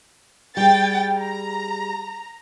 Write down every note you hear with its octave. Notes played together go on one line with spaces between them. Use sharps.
G3 G#4 G5 A6
A#5